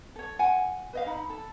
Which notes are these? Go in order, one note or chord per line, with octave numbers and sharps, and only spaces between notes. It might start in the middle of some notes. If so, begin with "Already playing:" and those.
A4 C#5
F4 F#5 G#5
B4 D#5 F5
D#4 E5 B5
A4